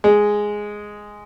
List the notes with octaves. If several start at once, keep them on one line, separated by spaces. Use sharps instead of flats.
G#3